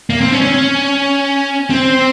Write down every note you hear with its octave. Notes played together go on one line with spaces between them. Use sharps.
A#3
C4
C#4
C#4
C4